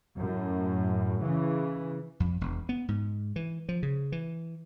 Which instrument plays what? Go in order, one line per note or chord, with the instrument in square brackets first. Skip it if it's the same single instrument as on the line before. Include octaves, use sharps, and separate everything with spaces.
[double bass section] F#2 A2
C#3 E3
[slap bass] F2
E1
B3
G#2
E3
F3
C#3
E3